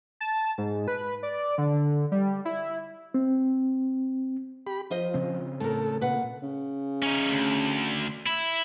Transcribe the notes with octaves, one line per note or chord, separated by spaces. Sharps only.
A5
G#2
B4
D5
D3
G3
E4
C4
G4 B5
F3 F4 C5 D#5
C#3 C4
A2 A4 A#4
A#2 B4 F#5
C#3
C#4 D#4
D2
E4